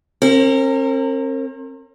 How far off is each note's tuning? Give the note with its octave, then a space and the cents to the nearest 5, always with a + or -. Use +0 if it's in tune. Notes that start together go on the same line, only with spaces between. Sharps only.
C4 +45 A#4 -30